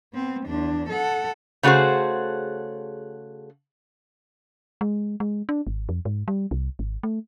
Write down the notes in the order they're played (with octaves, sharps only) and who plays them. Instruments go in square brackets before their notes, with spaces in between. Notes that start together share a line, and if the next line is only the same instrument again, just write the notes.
[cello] B3 C4
E2 D4
A4 F#5
[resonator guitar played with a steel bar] C#3 A3 F#4 G#4 C5
[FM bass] G#3
G#3
D4
G#1
F2
G#2
G3
C2
G#1
A3